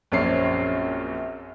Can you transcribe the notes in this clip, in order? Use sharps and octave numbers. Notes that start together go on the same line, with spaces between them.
A#1 F#2 C4 C#5 D5 C7